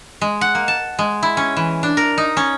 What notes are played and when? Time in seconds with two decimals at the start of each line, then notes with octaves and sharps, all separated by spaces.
0.21 G#3
0.41 F#5
0.55 A#3
0.68 A5
0.99 G#3
1.23 E4
1.37 C#4
1.57 E3
1.83 D4
1.97 A#4
2.18 D#4
2.37 C#4